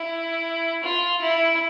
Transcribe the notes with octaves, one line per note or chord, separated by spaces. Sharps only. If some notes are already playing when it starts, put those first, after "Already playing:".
Already playing: E4
F4
E4